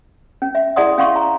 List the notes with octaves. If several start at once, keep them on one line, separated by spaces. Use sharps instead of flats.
C#4
E5
E4 G#4 D5 F#5 C6 D#6
C#4 F5 F#5 C6 C#6
A#5